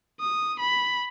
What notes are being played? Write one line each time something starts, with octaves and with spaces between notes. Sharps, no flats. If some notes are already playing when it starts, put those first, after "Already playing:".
D#6
B5